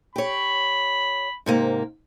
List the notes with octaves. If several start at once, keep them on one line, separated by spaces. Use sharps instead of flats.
G4 C#5 B5
G#2 C3 A#3